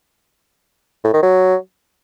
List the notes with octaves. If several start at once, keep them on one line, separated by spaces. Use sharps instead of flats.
A2
D#3
F#3